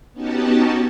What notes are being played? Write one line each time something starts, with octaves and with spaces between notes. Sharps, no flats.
B3 C#4 D#4 F#4 G4 A5